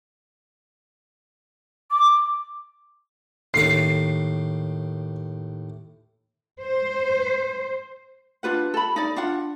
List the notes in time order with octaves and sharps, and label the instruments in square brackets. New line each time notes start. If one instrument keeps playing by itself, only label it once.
[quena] D6
[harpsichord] D#2 A2 D6 [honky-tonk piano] C7
[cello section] C5
[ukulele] D4 F4 B4 F#5
A4 B5
D#4 D5
D4 F4 F#5